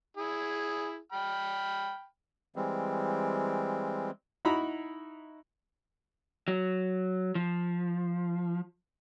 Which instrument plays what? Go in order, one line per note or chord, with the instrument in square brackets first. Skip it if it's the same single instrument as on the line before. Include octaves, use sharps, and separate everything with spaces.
[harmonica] E4 G#4
G5 B5 F6
[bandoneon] E3 G3 G#3 C4
[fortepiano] D#4 E4 F#4 A#5 B5
[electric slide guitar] F#3
F3